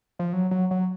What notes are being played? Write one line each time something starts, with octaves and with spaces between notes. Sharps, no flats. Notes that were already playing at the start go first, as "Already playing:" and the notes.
F3
F#3
F#3
F#3